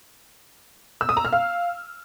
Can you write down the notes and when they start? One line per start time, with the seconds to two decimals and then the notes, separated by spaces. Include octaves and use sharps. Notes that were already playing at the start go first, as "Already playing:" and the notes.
1.01 E6
1.09 D#6
1.17 A#5
1.25 F6
1.33 F5